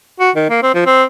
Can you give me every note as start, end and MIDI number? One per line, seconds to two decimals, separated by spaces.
0.20 0.31 66
0.36 0.46 51
0.50 0.61 58
0.63 0.73 60
0.74 0.85 53
0.86 1.04 60